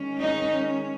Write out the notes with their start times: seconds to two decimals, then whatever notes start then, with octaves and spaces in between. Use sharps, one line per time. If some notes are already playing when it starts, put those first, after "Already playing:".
Already playing: D#3 G#3 C#4
0.20 D#4